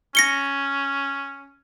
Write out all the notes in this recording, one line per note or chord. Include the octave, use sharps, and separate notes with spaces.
C#4 A#6 C#7 G7